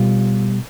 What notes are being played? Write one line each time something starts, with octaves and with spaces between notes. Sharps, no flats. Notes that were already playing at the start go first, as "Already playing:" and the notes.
Already playing: B2 G3 F4